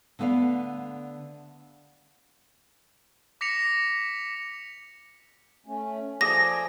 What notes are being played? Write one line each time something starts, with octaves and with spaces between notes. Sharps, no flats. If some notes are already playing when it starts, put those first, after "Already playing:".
D3 A3 B3 D5 F5
D6 A#6 B6 C#7 F7
A3 C#4
F3 G#4 A4 D5 A#6